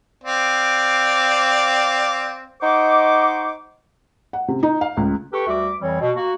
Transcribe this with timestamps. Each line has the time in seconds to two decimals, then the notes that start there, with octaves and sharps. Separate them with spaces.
0.24 C4 D5 F5
2.61 D#4 C5 D#5 F#5 C#6 D6
4.33 F#5
4.48 C3
4.63 D#4
4.81 F5
4.97 C#2
5.33 G4 A4 B4 C#6
5.47 D2 G3 F#4 E5 D6
5.81 F2 E3 G3 C4 C#5
6.01 B2
6.16 A#3 F#4